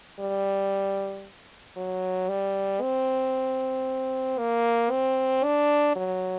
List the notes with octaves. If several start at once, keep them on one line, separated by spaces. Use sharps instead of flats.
G3
F#3
G3
C4
A#3
C4
D4
F#3